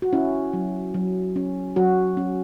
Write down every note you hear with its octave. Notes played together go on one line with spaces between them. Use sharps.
F#4
C#4 E4
F#3
F#3
C#4
F#3 F#4
C#4